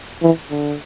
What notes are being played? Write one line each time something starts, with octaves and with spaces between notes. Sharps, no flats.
E3
D3